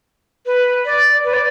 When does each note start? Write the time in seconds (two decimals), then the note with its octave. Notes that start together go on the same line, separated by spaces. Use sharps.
0.46 B4
0.85 D5
1.24 B4
1.34 D5